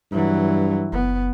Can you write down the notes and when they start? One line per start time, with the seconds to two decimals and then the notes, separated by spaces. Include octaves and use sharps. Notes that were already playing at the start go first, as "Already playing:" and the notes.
0.12 G2 E3 F#3
0.93 F#1 B3